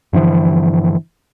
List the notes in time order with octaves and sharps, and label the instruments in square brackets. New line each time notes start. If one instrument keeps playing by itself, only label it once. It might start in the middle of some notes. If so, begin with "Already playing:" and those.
[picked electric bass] G2 D3 E3 F3